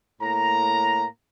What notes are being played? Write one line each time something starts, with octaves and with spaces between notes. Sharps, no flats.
A2 A#3 A#5